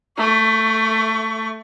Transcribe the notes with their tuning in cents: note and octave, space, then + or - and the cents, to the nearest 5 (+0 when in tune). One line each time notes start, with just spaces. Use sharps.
A3 +10 C#6 +25